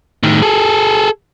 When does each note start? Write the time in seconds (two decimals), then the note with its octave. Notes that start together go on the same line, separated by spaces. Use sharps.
0.23 A2 D#3
0.42 G#4 A4